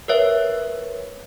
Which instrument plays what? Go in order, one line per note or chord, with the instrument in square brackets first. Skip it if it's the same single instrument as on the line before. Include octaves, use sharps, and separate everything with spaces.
[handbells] A#4 B4 C#5 E5